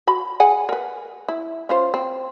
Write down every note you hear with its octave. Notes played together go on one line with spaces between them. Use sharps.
F#4 B5
G#4 F#5 G#5
A#4 B4
E4
C#4 F4 C5
C4